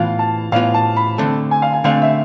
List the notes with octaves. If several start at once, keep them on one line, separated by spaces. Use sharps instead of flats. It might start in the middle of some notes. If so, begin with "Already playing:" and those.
Already playing: A2 E3 B3 F4 F5
A5
A2 E3 B3 F4 F5
A5
B5
D3 A3 C4 A5
G#5
F5
G#5
D3 A3 C4 F5
E5